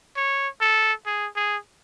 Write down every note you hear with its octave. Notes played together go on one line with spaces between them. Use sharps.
C#5
A4
G#4
G#4